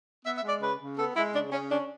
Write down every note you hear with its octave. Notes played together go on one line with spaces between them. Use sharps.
B3 E5
E5
G#3
D5
C#3 B4
C#3
B3 A4
G#3 E4
C#3 D4
C#3 C#4
C#4 D4